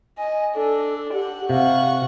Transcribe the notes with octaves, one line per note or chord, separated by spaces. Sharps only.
D#5 G#5
D4 A4
G4 F#5
C3 F5 F#5 C#6